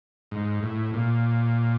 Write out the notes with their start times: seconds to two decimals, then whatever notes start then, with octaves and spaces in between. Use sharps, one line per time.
0.31 G#2
0.63 A2
0.94 A#2